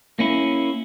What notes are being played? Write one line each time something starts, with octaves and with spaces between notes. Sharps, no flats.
A#3 C#4 E4